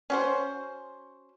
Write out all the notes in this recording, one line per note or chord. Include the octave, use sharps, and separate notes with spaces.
C#4 F#4 C5